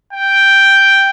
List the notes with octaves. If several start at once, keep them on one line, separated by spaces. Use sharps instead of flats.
G5